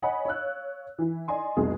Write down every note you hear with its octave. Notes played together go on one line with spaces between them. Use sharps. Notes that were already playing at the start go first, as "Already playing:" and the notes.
C#5 D#5 F#5 G#5 B5
C#5 F5 E6 F#6
E3 E4
D5 D#5 G#5 C6
F1 C2 B2 G3 G#4 D#6